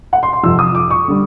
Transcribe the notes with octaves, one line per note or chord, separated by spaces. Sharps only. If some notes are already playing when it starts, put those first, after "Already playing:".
F#5
C6
C6
F2 C3 F3 E6
D#6
D6
C#6
D3 G3